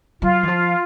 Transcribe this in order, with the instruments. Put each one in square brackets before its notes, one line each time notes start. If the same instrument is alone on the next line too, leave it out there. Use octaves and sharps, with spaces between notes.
[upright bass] F#3 [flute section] F4
[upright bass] E3
F3